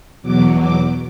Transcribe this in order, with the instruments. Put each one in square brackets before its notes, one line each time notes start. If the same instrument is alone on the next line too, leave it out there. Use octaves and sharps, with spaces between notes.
[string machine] E2 B2 F#3 D6
D6